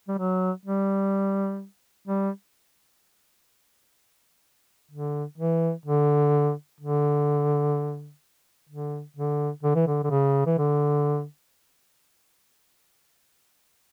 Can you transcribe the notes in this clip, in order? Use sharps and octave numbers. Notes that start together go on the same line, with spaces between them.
G3
F#3
G3
G3
D3
E3
D3
D3
D3
D3
D3
E3
D3
D3
C#3
E3
D3